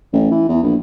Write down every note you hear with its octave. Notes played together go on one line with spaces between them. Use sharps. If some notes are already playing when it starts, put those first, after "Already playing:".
A1
E3
E2
A#1